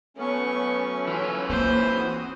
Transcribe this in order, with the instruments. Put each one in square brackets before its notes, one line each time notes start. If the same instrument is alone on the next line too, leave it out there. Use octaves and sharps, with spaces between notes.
[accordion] F#3 A3 C#4 [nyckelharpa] B3 C#6
[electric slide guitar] E3 F4
[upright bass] A#3 C4 [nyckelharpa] C5
[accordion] F#4 D#6